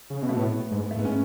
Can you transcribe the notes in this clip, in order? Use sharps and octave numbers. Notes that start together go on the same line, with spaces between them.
C#3
B2
A3
A2 B3
G#2
A3
G#2 B3
C#4